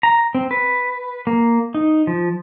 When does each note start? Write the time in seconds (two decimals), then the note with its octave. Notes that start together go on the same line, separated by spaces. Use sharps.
0.03 A#5
0.35 C4
0.51 B4
1.27 A#3
1.74 D#4
2.07 F3